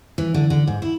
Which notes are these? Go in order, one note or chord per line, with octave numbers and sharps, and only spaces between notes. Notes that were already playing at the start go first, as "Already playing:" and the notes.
E3
D3
D3
G#2
E4